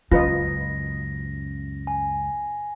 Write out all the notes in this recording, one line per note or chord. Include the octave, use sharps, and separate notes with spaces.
C#2 F#2 C#4 F4 B4 D#5 A#6
G#5